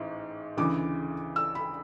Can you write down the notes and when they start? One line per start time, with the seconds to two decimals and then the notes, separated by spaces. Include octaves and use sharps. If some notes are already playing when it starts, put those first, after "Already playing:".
Already playing: A1 G#2
0.57 D2 C#3 E3 D6
1.36 E6
1.55 B5